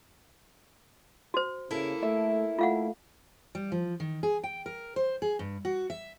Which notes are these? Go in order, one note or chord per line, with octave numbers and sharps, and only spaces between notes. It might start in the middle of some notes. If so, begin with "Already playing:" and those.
F#4 C5
C#3 A#3 E4 A4
A3 E5
A3 F4 F5 F#5
G3
F3
D#3
G#4
G5
A#4
C5
G#4
G2
F#4
E5